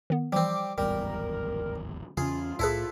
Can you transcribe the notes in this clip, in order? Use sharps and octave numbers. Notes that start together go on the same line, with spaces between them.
D#3 B3
E3 F3 G3 C4 D6
D1 G#1 E2 G3 A#4
E2 C#3 C#4 F4 G#4
C2 A2 E4 G#4 A4 B4